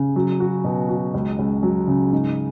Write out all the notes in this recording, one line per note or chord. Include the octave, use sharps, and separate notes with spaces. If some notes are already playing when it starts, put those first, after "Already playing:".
Already playing: C#3
F#3
F#4
B2
F#4
C#2
C#2
F#3
C#3
G#2